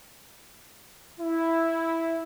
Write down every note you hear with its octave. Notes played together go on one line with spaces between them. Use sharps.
E4